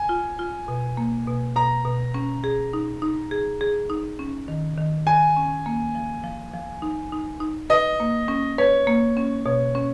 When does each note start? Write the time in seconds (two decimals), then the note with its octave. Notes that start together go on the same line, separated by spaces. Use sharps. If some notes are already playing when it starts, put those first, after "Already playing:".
Already playing: G#5
0.09 F4
0.39 F4
0.68 B2
0.97 A#3
1.27 B2
1.56 B2 A#5
1.85 B2
2.14 C#4
2.44 G#4
2.73 D#4
3.02 D#4
3.31 G#4
3.61 G#4
3.90 D#4
4.19 C#4
4.48 D#3
4.78 D#3
5.07 D#3 G#5
5.37 C#4
5.66 A#3
5.95 F3
6.24 F3
6.53 F3
6.82 D#4
7.12 D#4
7.40 D#4
7.70 B4 D#5
8.00 A#3
8.28 C#4
8.58 B4 C#5
8.87 A#3
9.17 C#4
9.45 B2 C#5
9.75 C#4